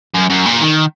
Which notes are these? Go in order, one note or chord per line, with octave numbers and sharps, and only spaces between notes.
F#2
F#2
A#2
D#3